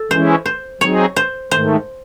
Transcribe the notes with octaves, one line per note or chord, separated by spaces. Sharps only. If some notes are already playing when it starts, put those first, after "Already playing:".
Already playing: A4
E3 G#3 C#4 E4 C5
C5
F#3 C4 D#4 G#4 C#5
C5
G#2 D#3 A3 C5